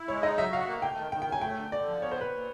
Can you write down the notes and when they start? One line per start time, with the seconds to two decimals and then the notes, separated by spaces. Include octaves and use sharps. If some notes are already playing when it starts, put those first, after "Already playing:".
Already playing: E4
0.08 G#3 C#5
0.23 D#4 D#5
0.38 F#3 E5
0.52 F#4 F5
0.67 A#3
0.82 A3 G5
0.97 D#3
1.12 D#3 G5
1.22 G5
1.27 F#3
1.32 G#5
1.41 A3 G5
1.57 D3
1.72 D3 D5
1.87 F3
2.02 B3 C#5
2.11 C5
2.16 A#2 B4
2.31 A#2